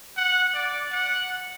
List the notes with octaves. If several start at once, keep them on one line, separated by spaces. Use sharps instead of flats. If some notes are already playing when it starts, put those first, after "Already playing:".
F#5
D5
F#5